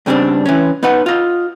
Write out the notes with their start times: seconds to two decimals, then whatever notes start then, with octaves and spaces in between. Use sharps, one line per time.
0.06 G2 C#3 G3 C4 D4
0.46 E3 C#4
0.83 B3 D#4 B4 F#5
1.06 F4 D#5